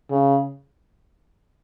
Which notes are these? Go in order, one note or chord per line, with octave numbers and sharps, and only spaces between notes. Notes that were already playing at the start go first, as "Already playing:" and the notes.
C#3